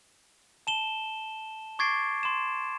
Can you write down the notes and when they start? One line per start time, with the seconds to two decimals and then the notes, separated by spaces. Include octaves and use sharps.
0.67 A5 E7 G7
1.79 C#6 D6 G#6 A6 C7 D7
2.23 C6 E7